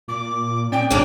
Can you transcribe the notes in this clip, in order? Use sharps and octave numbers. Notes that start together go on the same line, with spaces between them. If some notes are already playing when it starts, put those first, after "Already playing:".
A#2 D6
C4 C#4 D5 G5
B1 C#3 A#3 D4 D6